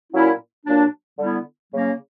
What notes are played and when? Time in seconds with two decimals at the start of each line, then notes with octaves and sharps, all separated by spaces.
0.12 A#2 F#3 A#3 C#4 E4
0.65 A#2 F#3 A#3 D4
1.18 D3 G3 B3 E4
1.72 C#3 F#3 A#3 C#4